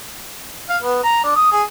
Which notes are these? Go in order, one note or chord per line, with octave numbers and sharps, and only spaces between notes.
F5
B3
A#5
D4
D#6
G#4